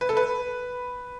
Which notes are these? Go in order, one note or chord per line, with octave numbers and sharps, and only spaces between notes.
B4
A4
B4